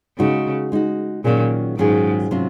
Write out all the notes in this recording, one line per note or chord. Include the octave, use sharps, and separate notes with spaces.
C#3 G#3 D#4 F#4
G#3 D#4 F#4
A#2 D#3 F#3 C#4 F4 G#4
G#2 D#3 F#3 C#4 F4 G#4
C3 F#3 C#4 F4